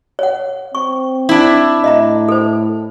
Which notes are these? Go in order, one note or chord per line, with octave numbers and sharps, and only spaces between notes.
C#5 F#5
C4 C#6
D4 E4
A2 D#5 E5 A#5
A4 C5